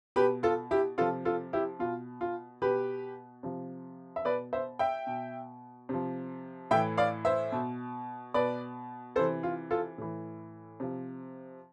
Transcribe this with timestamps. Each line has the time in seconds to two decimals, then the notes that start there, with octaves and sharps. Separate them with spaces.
0.16 B2 G4 B4
0.43 F4 A4
0.71 E4 G4
0.98 C3 F3 F4 A4
1.25 F4 A4
1.53 E4 G4
1.79 B2 F4
2.21 F4
2.62 B2 G4 B4
3.43 C3 F3
4.16 E5
4.25 B2 B4 D5
4.53 C5 E5
4.79 E5 G5
5.07 B2
5.89 C3 F3
6.71 A2 E3 E5 G5
6.98 D5 F5
7.25 C5 E5
7.52 B2
8.34 B2 B4 D5
9.16 C3 E3 A4 C5
9.43 F4
9.71 F4 A4
9.98 A2 E3
10.80 C3 F3